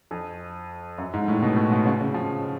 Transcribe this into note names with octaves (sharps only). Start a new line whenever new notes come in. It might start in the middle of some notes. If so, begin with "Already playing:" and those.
F2
F#2
G#2
A2
B2
A2
B2
C#3
C#3
F3